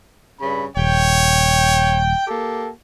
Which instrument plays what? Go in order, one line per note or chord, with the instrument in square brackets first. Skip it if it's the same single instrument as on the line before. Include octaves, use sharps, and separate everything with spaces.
[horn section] G2 C#3 B5
[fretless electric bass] D#1 [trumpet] C#5 [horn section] G5
[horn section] A#3 G4 A4